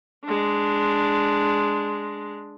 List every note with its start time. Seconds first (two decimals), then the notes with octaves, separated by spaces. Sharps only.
0.25 G#3 D4